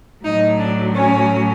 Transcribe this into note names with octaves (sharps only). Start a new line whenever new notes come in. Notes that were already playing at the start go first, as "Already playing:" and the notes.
A2 F#3 D#4
D4
C#4